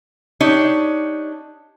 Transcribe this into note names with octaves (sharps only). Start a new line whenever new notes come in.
D4 D#4 G4 C#5